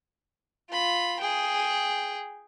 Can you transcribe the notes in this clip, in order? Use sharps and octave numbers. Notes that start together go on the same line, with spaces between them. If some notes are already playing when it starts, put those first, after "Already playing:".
F4 B5
G#4 G5